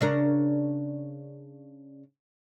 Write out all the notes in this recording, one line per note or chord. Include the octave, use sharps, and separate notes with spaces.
C#3 D4 A#4